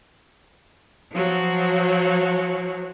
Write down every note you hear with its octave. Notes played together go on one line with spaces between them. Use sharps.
F3 F#3